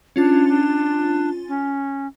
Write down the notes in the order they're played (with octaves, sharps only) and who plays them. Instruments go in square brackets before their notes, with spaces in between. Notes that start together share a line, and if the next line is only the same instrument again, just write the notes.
[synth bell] C#4 F4 A6 [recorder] D4
[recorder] D4
C#4